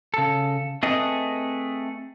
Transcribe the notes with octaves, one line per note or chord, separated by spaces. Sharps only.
C#3 A4
A3 C4 G#4 B4 D#5